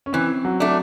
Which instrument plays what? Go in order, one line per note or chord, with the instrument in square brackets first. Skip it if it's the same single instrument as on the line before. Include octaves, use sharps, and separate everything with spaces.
[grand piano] C#4
[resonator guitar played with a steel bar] E3 [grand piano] C4
[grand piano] F#3
[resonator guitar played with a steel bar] A3 D4